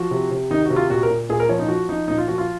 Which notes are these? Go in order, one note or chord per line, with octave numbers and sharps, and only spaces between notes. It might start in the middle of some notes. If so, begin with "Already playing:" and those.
Already playing: F3 F#4
C3
C3
D#3 D#4
C3 F#4
F4
A#2 F#4
A#4
A#2
A#2 G#4
A#4
F3 C#5
D#4
F3 F#4
F3 D#4
A#2 D#4
F4
F3 F#4
F4